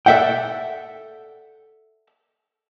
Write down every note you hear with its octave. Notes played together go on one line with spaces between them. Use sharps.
A4 D5 E5 F#5 G5